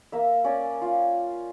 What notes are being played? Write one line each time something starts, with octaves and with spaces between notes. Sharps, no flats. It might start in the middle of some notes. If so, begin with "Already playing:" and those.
A#3 E5
C#4 D5
F4